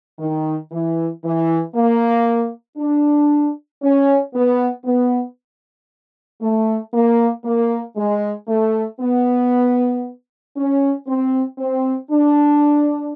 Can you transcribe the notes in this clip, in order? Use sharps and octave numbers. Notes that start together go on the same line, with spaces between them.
D#3
E3
E3
A#3
D4
C#4
B3
B3
A3
A#3
A#3
G#3
A3
B3
C#4
C4
C4
D4